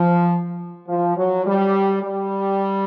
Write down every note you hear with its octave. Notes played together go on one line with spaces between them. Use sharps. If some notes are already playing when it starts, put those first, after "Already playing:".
Already playing: F3
F3
F#3
G3
G3